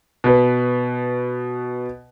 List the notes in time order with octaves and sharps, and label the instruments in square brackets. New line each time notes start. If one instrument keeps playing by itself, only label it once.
[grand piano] B2 B4